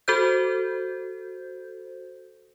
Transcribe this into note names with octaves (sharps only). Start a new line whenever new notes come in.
F#4 A4 C5 G6